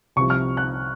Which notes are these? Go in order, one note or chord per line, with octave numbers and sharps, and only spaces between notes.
C2 C3 F3 C#6
F6
F#6